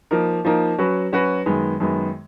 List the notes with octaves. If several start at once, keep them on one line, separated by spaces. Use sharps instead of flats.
F3 A#3 D#4 A#4
F3 A#3 D#4 A#4
F#3 C#4 F#4 B4
F#3 C#4 F#4 B4
F#2 D#3 G#3 B3
F#2 D#3 G#3 B3